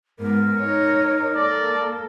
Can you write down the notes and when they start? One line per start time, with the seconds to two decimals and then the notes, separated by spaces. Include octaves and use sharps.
0.19 G#2 B3 A#4
0.58 D#4 C#5
1.36 A#3 A4 D5